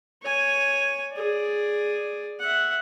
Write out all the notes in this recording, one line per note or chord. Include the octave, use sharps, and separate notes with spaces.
C#5 G#5
G#4 D5
E5 F#5